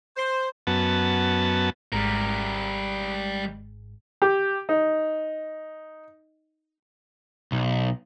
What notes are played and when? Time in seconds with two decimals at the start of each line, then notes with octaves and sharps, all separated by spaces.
0.16 C5
0.67 F#2 B3 A5
1.93 G#1 G#2 G3 G#3 A#4
4.22 G4
4.69 D#4
7.52 B1